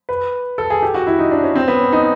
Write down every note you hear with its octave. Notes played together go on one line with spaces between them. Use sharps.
B4
A4
G#4
G4
F#4
E4
D#4
D4
C#4
C4
B3
C#4
D#4